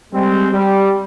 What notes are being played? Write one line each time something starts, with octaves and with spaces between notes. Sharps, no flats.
G3 G#3 C4
G3